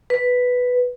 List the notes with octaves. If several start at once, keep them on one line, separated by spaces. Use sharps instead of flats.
B4